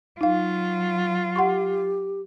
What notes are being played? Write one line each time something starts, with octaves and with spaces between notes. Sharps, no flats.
F#3 D#4 F4 F5
G4 F#5 C6 C#6